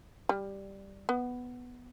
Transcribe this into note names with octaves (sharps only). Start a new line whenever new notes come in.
G3
B3